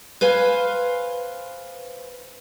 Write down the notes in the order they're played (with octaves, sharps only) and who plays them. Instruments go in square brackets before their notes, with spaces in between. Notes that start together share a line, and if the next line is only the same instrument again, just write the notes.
[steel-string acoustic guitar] B4 C5 F5 G#5